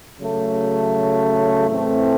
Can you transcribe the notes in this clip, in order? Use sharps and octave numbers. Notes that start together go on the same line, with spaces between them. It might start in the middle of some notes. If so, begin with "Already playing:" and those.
C#3 F#3 A3
A2 E3 A3 C4